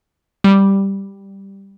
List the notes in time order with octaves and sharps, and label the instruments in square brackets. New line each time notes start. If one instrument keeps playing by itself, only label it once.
[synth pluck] G3